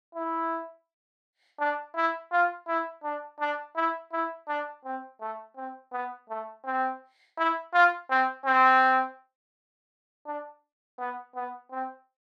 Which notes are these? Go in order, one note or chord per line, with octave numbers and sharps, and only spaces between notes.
E4
D4
E4
F4
E4
D4
D4
E4
E4
D4
C4
A3
C4
B3
A3
C4
E4
F4
C4
C4
D4
B3
B3
C4